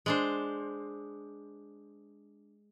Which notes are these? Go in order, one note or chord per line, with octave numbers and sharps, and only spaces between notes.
G#3 D4 C5